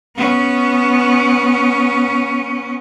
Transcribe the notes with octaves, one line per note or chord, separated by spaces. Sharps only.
B3 C#4